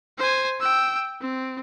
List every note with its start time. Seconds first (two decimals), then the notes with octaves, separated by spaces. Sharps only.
0.18 C5 G#5
0.60 G5 E6
1.21 C4